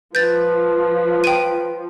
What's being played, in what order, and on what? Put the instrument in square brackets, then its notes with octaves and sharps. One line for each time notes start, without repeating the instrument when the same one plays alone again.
[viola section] F3 [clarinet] B4 [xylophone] G6 A6
[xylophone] G5 D#7